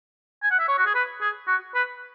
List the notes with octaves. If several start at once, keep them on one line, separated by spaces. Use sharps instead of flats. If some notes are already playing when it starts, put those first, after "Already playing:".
G#5
F#5
E5
C#5
F#4
G#4
B4
G#4
F#4
B4